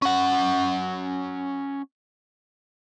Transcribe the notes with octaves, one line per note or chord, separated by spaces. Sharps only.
C#4 F#5